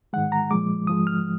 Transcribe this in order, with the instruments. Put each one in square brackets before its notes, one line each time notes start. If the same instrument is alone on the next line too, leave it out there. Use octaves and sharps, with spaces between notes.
[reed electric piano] G#2 D#3 G#3 F#5
A#5
A#2 F3 G#3 D6
G#2 F3 G#3 D#6
F6